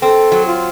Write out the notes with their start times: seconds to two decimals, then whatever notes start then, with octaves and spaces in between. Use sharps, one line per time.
0.02 C4 A4
0.32 F#3
0.46 F4